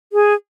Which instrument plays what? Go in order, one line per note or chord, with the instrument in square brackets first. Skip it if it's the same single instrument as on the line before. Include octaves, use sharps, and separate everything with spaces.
[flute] G#4